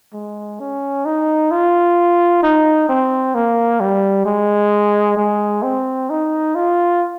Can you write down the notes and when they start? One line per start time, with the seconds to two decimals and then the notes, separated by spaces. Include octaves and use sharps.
0.13 G#3
0.60 C#4
1.06 D#4
1.51 F4
2.43 D#4
2.89 C4
3.35 A#3
3.80 G3
4.25 G#3
5.17 G#3
5.63 C4
6.10 D#4
6.55 F4